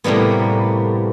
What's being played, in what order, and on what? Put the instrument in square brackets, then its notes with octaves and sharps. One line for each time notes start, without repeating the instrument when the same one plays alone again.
[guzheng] A2 C3 G3 A#3 B3